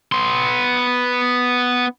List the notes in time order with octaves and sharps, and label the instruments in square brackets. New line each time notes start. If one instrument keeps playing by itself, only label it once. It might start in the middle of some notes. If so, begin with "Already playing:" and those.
[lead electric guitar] B3 C6